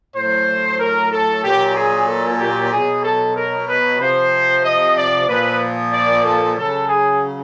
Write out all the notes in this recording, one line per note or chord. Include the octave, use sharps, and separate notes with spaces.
A2 F#3 C5
A#4
A4
A#2 F#3 G4
G#4
A4
G4
B2 F#3 G#4
A4
A#4
B4
C3 F3 C5
D#5
D5
A#2 F3 B4
D5
A4
C#3 F#3 A4
G#4